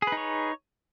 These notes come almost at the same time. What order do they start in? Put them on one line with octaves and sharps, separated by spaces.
G#4 B4 D#4 C#5